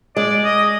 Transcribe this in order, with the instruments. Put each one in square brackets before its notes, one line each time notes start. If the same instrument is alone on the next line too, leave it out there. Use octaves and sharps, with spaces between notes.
[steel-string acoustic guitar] G#3 [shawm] D5
[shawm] D#5